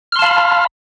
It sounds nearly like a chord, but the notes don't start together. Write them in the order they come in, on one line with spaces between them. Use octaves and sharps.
F6 C6 A5 F5 B5